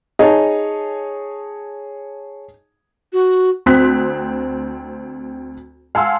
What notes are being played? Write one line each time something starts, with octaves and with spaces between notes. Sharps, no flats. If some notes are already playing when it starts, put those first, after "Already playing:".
D#4 G#4 C#5 A5
F#4
D2 C4 C6 D#6 F#6 B6
F5 F#5 G#5 A5 C6 E6